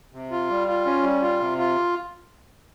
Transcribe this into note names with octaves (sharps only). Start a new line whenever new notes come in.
C3
F4
G3
F4
C#4
G3
F4
C3
F4